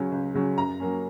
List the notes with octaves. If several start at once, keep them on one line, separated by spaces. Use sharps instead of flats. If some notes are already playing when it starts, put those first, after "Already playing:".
Already playing: C#2 C#3 F#3 C#4
C#2
C#3 F#3 C#4
F#2 A#5
F#3 A#3 C#4